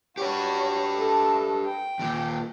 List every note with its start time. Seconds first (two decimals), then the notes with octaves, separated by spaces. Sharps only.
0.18 F#4 G4 B4 C#5
0.95 A3 A4
1.65 G5
1.99 D#2 A#2